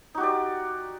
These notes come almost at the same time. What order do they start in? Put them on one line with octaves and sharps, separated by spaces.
D#4 F#4 G4 D5